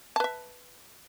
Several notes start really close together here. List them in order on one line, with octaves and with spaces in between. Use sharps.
A5 B4 E5